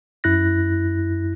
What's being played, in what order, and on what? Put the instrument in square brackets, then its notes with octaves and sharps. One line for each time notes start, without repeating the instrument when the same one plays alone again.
[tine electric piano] F#2 E4 F#6 A#6